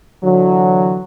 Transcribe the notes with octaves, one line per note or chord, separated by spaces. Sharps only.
D3 E3 F#3